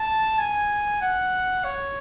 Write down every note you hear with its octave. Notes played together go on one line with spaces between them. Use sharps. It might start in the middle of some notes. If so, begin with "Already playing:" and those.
Already playing: A5
G#5
F#5
C#5